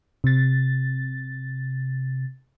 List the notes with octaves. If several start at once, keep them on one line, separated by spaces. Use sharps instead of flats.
C3 A6